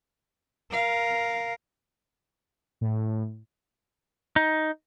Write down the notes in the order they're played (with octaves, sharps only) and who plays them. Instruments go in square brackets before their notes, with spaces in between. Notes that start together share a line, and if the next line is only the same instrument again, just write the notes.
[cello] A#4 F5
[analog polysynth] A2
[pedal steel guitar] D#4